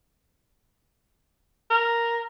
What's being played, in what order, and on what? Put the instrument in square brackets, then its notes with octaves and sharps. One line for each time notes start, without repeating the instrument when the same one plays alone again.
[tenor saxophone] A#4